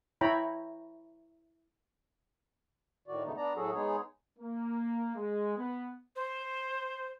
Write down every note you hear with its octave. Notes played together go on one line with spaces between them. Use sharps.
E4 C#5 G5 A#5 B5
A2 D#3 F#4 D5
E2 G#2 C#3 A3 B3 D#4
B3 D4 D5 A#5
A2 F#3 F#4 G#4 A4
G#3 B3 D#4 G#4 C#5
A#3
G#3
B3
C5